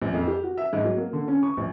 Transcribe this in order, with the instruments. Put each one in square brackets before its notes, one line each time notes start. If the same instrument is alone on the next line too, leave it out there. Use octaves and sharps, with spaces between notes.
[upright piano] A#1
F2
G4
F#4
E5
G#2
F#3
A#3
D3
C#4
C#6
A#1